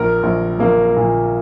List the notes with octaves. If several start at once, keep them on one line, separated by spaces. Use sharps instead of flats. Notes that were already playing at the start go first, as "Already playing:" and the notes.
Already playing: A#1 A#4
A#1
A#1 A#3
A#2